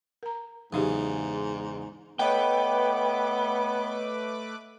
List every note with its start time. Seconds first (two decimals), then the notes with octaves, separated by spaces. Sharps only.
0.23 A#4 A#5
0.73 E2 G#2 C#3 F#3 D#4 G4
2.19 A3 B3 B4 C#5 D#5 G5 D6